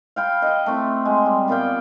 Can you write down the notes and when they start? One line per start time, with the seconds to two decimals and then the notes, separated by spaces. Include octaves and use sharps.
0.16 F5 G5 B5
0.42 D#5 F#5 G5
0.66 A3 C4 E4
1.05 G#3
1.26 G3
1.48 A#2 B3 F5 G5